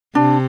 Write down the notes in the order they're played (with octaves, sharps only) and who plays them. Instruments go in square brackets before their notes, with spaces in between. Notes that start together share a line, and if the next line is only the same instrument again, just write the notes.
[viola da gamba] C3 [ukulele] D4